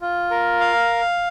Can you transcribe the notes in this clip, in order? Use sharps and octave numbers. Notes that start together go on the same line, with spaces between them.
F4
A#4
F5